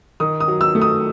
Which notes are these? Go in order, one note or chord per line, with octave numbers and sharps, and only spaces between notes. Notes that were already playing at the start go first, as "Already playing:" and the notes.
D#3 D#6
D#6
F#3
E6
A3
D#6